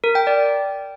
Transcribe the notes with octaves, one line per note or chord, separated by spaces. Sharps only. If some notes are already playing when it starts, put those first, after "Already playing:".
A#4
G5
D5